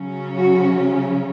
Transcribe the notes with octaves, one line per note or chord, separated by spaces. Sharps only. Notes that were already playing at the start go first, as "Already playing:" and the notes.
Already playing: C#3 F#3 C#4
F#4